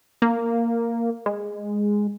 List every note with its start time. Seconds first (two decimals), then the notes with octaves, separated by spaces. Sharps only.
0.22 A#3
1.26 G#3